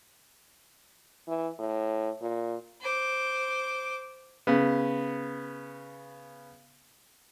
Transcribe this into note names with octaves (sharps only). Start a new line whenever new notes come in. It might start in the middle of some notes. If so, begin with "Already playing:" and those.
E3
A2
A#2
C5 D6
C#3 B3